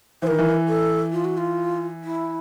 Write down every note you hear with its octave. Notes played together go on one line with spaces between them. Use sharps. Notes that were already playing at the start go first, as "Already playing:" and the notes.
E3 C5
D#3 A#4
E3
A4
F4
F#4
F4
E4